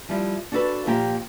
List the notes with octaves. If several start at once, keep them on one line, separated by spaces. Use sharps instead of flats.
F3 G3 E4
D4 F#4 A4 B4
A#2 F3 A#3 G4 G5